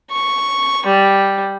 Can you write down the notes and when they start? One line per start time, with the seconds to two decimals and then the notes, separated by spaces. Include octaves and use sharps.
0.11 C#6
0.87 G3